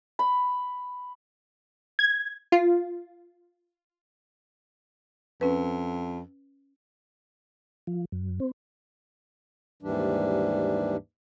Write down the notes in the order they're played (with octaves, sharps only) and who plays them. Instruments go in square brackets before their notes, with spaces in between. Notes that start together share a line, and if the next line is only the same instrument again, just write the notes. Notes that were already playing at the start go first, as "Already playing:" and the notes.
[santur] B5
[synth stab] G#6
F4
[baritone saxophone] F2 [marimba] C#4 B4
[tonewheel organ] F3
F#2
C4
[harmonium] D#2 G#2 E3 G3 D4